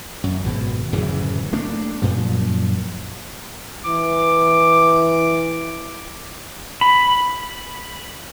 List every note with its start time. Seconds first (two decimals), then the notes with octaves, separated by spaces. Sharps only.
0.24 F#2
0.44 G#1 B2
0.93 D1 F#2 C#3 E3
1.53 A3 A#3 D4
2.02 F#2 A#2 F3
3.85 E3 D6
6.81 B5